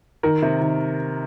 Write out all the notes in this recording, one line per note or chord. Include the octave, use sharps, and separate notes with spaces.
D#3 A#4
C3
D#3